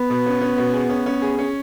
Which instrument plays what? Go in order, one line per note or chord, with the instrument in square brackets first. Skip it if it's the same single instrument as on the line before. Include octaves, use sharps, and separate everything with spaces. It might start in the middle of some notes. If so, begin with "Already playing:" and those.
Already playing: [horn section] B3
[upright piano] B2
C#4
C#4
B2
G#4
C#4
C#4
G#4
C#4